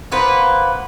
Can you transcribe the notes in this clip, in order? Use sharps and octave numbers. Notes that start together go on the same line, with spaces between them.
A#3 B3 B4 C5